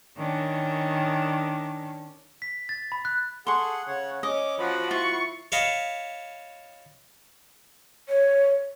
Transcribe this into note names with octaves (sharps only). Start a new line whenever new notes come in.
D#3 C#4 D4
B6
A6
B5
F#6
G#4 A4 F#5 C6 C#6
C#3 C#5 F#5
C#4 D#5 D6
F3 F#4 F#5 B5
E4 F4 C#6
C#5 D#5 F5 A5 B5
C#5